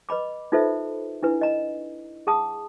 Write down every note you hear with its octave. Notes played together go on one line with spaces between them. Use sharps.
B4 D#5 B5 D6
D#4 F4 A4 B4 C5 E5
D4 E4 B4
D#5 A#5
G#4 F#5 A5 D#6